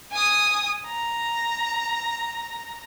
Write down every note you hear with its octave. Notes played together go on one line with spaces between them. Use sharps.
G#5 D#6
A#5